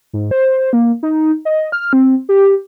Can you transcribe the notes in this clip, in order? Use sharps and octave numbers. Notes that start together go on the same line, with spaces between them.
G#2
C5
A#3
D#4
D#5
F6
C4
G4